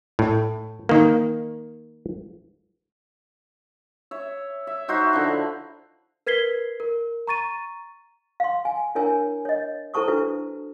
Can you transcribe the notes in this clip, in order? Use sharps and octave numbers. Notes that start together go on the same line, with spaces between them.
A2
D#3 A#3
C#5 E5
E5
D#4 F#4 C5 E5
D3 F3 E4
A#4 B4 G#6 B6 C7 G7
A#4
A#5 C#6 A6 D#7
F5 C6
G#5
D4 E4 A#4 C#5 G#5
C#5 D#5
E4 A4 C5 A5 C#6 D#6
D4 E4 F#4 B4